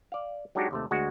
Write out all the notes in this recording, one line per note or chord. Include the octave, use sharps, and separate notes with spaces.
D5 F5
F#3 G#3 D4 D#4 F#4 G4
D#2 C3 A3
D2 G#3 F#4